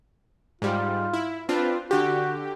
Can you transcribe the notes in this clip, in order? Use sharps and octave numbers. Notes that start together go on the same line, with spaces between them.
G#2 G3 F4
E4
C4 D4 F4 B4
D3 F#4 G4